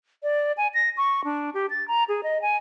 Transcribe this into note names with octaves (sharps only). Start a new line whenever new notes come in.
D5
G#5
A#6
C#6
D4
G4
A6
A#5
G#4
D#5
G#5